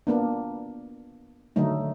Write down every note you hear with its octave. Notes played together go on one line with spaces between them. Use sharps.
A#3 B3 D4
D3 D#3 F#3 A3 D#4